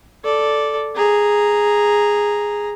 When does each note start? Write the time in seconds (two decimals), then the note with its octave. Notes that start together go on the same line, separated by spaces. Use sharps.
0.24 A4 D5
0.96 G#4 A#5